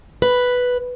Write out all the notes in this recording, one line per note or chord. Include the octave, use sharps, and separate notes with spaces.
B4